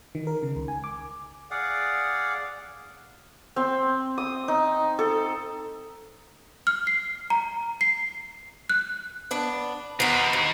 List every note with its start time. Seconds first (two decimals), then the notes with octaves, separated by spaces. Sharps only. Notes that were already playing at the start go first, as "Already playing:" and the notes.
0.15 D#3
0.27 A#4
0.43 C#3
0.56 C#2
0.68 G#5
0.84 D6
1.51 G#4 D5 F5 F#5
3.56 C4
4.18 D#6
4.48 D#4
4.99 A4
6.67 F6
6.87 C7
7.30 A#5
7.81 C7
8.70 F#6
9.31 B3 D4
10.00 D#2 B3 A#4
10.33 D2